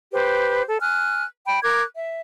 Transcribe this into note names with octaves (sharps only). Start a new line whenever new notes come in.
G4 B4 C5
A4
G#5 F6 F#6
G5 B5
A#4 D6 F#6 G#6
E5